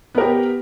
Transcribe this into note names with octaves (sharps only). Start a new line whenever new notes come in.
B3 G4 A#4